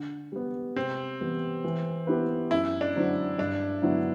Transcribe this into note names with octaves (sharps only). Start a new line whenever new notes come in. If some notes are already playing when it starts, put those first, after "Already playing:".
Already playing: D3
G3 B3
C3 C4
E3 G3 B3
E3
B3 E4 G4 B4
F#2 E4
D4
D3 F#3 C4 E4
G2 D4
D3 F#3 B3 E4